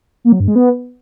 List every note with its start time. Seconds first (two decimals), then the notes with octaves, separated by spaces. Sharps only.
0.25 A#3
0.32 F#3
0.40 G2
0.48 G#3
0.56 B3